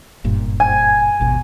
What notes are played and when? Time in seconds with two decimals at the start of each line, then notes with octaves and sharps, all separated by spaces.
0.24 F#1 G2 A#2
0.60 G#5
1.20 D#1 G#1 B2